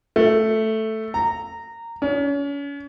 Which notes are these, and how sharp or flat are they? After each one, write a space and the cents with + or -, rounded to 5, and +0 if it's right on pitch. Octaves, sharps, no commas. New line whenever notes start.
A3 +0
A#5 -15
C#4 +35